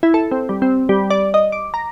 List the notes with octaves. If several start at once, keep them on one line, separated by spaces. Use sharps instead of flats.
E4
A4
C4
G3
C4
G3
D5
D#5
D6
A#5